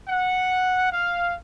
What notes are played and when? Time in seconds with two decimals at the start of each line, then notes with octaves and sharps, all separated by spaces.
0.08 F#5
0.90 F5